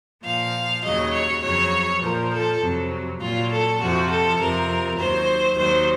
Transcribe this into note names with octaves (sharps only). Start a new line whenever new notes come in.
A#2 F3 F5
D#2 C#3 F#3 D#5
C#5
F2 C#3 F#3 C#5
A#2 F3 A#4
A4
F2 C3 F#3
A#2 F#3 F4
A4
F2 C3 F3 F#4
A4
F2 C3 F3 A#4
D#2 D#3 F#3 C5
D#2 D#3 F#3 C5